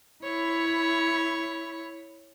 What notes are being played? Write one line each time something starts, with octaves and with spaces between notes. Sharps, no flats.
E4 C#5